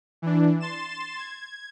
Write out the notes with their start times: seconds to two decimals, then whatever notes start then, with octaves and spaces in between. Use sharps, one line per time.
0.22 E3 D4
0.60 C6 A6 E7
1.18 G#6